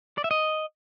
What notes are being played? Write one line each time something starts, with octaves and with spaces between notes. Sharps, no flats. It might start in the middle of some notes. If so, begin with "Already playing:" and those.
D5
E5
D#5